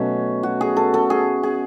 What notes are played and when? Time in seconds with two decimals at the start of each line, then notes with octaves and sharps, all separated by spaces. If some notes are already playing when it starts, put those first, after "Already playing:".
Already playing: B2 F#3 A3 C#4
0.43 F#4
0.61 G#4
0.77 A4
0.94 A4
1.10 G#4
1.43 G#4